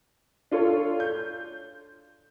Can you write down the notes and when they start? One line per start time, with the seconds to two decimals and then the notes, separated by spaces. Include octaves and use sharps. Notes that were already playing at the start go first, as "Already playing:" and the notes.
0.51 D4 F4 A4 C#5
1.00 G6